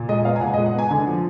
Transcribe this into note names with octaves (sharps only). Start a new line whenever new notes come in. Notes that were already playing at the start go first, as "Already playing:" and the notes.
Already playing: A#2
G#3 D#5
B3 F5
G#5
A#2 F#5
D#5
G#3
F#5
B3 G#5
D3 G#5
F3